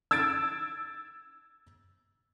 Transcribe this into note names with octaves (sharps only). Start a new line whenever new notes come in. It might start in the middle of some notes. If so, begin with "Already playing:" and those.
E6 G#6 A6 D7